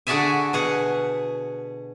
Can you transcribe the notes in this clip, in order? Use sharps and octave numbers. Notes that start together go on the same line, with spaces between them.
D3 F#4 G#4 D5 E5 G#5
B2 G#4 F#5